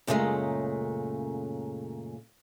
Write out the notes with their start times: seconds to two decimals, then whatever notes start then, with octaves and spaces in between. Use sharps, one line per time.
0.07 F#2 A#2 C#3 E3 G#3 A3